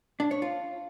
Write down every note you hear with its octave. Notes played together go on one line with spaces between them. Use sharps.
D4
C#5
F4